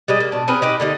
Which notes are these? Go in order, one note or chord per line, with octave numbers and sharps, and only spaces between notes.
G3 G#3 D#5
A#3
B2 D4
C4 G#4 A#4 B4
D#4 G4 B4
D3 A#3 D#4 G4